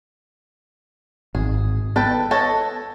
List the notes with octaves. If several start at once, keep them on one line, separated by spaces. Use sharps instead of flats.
G#1 G#4
B3 A4 B4 G5
A4 C#5 D#5